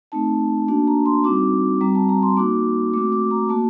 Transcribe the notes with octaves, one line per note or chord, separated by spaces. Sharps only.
A3 C4 D#4 A5
A#3 D4 F#4 A5
A#5
C6
G3 C4 D#4 F#4 D6
G3 C4 F#4 A#5
A5
A#5
C6
A#3 D#4 F#4 D6
A3 C4 F#4 D6
D6
A#5
A#3 F#4 A5